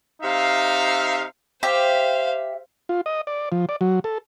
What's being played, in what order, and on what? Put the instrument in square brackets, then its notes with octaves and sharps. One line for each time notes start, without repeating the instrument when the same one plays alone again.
[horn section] C3 D#4 E5 F5
[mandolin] G4 E5 [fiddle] C5 F5
[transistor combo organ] F4
D#5
D5
F3
D5
F#3
A4